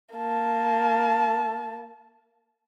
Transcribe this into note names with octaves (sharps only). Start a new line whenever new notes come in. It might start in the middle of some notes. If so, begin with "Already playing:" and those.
A#3 A5